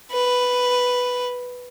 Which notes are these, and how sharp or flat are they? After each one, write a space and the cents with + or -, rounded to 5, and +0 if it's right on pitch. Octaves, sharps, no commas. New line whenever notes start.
B4 +0